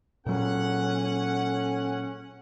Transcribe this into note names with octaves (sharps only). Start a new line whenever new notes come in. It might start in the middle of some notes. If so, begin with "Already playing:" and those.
A#2 F#3 C#4 A4 F#5